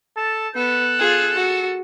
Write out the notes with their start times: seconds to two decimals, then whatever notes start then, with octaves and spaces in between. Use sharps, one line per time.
0.17 A4 A5
0.55 B3 A4 F#6
0.99 F4 G#4
1.34 F#4